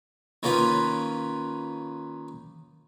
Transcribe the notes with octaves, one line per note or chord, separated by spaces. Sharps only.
D#3 A#3 C#4 F4 B4